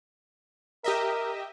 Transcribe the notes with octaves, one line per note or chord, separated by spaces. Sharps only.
G4 A#4 D#5 E5